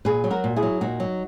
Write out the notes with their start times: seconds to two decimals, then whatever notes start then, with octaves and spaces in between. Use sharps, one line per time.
0.05 A#2 G#4 B4
0.24 F#3
0.31 F#4 A#4
0.44 A#2
0.56 E4 G#4
0.62 F#3
0.81 A#2 D#4 F#4
1.00 F#3